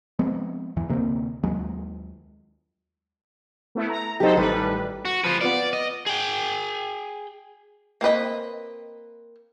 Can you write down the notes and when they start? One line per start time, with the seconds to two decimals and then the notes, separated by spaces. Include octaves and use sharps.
0.19 F3 G#3 B3 C4
0.76 D1 E2 E3
0.88 D2 C3 A#3 C4
1.43 D#2 F#3 G#3
3.75 A3 B3 E4
3.90 A#5
4.20 F#3 D#4 G4 A4 C5
4.36 A1 D#3 G3 A4 B4
5.05 F#4
5.24 F3 F4 B4
5.41 B3 F4 D5
5.73 D#5
6.06 G#4 G5
8.01 A#3 C4 B4 D#5